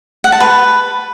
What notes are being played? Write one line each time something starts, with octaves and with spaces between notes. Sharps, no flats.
F#5
A5
B4